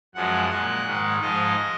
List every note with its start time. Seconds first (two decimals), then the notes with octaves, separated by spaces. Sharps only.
0.15 F#2 F3 G#3 F#5
0.50 A#2 G#3 F#5
0.85 G#2 D#3 G#3
1.20 G#2 F3 G#3 D#5